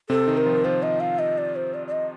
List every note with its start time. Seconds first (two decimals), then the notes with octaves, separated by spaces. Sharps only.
0.09 C3 C4 A4
0.27 D#3 D#4
0.37 A#4
0.46 F3 F4
0.64 F3 F4 C5
0.82 D#5
1.00 F5
1.19 D#5
1.38 D5
1.56 C5
1.74 D5
1.87 D5
1.92 D#5